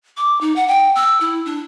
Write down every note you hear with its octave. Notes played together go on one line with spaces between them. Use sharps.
D6
D#4
F#5
G5
E6
E4
D4